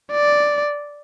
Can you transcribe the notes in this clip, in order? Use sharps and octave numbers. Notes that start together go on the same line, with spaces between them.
D5